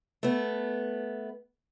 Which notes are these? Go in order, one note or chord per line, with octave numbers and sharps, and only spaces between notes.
A3 B3